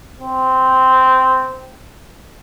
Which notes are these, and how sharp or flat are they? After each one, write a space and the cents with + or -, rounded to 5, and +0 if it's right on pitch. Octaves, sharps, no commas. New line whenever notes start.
C4 -10